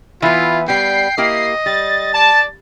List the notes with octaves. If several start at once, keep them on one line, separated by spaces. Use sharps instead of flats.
E3 B3 E4 F4
G3 B3 G5 C7
A#3 E4 G4 D#5
G3 A6
D5 A5